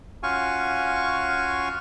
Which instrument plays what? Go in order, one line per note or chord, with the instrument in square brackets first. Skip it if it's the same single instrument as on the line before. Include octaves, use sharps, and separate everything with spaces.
[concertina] C#4 F4 F#4 F5 G#5 C#6